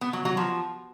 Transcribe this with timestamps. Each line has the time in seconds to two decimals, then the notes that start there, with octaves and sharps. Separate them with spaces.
0.01 B3
0.13 F#3
0.25 F#3
0.37 F3